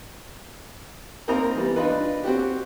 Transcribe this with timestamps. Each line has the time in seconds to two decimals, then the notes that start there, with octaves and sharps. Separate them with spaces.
1.28 A#3 C4 D#4 A#4 D#5 A#5
1.55 E3 G3 B3
1.76 D4 D#4 F4 B4
2.24 C4 F#4 G4